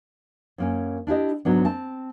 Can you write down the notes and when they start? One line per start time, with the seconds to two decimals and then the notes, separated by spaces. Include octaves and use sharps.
0.58 F#2 A#3 C#4
1.07 D4 E4 G4 D#5
1.45 G#2 F#3 B3 D4
1.65 C4 A5